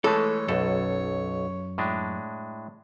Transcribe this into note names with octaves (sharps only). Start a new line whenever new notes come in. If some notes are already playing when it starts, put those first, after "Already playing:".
E3 G#3 A3 A4 C#5
B1 F#2 A4
A2 G#3 D4